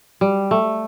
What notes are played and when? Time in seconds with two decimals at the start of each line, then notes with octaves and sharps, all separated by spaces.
0.21 G3
0.51 A3